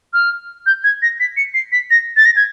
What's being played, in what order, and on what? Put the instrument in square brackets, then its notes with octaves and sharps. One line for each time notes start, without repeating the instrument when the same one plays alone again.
[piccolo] F6
G6
G#6
A#6
B6
C#7
C7
B6
A#6
A6
A#6
G#6